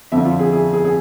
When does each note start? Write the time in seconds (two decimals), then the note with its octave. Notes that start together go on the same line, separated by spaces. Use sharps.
0.12 F2 D3 F3 E5
0.25 F4
0.39 G#4
0.52 G#4
0.73 G#4
0.85 G#4